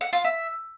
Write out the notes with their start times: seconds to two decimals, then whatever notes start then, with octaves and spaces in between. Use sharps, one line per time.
0.01 F#5
0.13 F4
0.24 E5